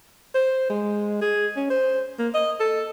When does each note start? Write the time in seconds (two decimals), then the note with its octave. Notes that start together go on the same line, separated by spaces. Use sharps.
0.35 C5
0.69 G#3
1.21 G#4
1.56 C#4
1.70 C5
2.19 A#3
2.34 D#5
2.60 A4